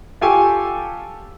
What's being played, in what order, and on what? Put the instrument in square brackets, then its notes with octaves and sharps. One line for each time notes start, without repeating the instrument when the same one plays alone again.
[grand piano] F4 G4 A4 G5 G#5 C#6